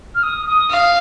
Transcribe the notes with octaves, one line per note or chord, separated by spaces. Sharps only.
F6
D#6
D#6
F5